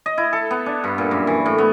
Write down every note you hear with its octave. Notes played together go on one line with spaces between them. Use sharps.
D#5
E4
A4
B3
D4
G2
A#2
F#2
E3
A2
B3